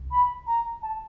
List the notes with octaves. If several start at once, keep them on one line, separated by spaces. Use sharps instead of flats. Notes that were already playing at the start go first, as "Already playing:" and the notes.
Already playing: C2
B5
A#5
A5